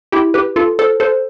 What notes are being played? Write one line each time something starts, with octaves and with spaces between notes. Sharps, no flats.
E4 G4
G4 B4
F4 A4
A4 C5
A4 C5